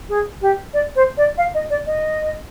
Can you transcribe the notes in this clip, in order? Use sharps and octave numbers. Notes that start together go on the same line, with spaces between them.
G#4
G4
D5
C5
D5
F5
D#5
D5
D#5